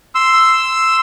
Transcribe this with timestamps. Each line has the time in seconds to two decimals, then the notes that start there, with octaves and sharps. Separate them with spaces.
0.15 C6 E6